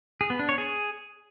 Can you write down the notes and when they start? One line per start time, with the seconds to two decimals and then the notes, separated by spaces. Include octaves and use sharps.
0.21 G#4
0.30 B3
0.39 D4
0.49 C#5
0.58 G#4